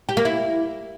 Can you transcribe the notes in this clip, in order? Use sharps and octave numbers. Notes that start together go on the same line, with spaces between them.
G4
A#3
E4